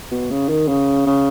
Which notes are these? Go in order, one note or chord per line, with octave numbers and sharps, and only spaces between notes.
B2
C#3
D#3
C#3
C#3